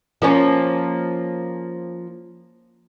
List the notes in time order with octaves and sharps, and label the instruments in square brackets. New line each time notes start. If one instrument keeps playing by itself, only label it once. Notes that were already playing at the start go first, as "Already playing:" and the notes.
[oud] F3 A#3 C#4